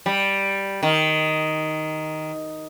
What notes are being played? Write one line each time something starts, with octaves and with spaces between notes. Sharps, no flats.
G3
D#3